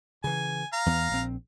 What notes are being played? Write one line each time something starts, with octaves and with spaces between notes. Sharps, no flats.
C#3 E3 G#5
F5 A#5
E2 E3 B3
A#1 C4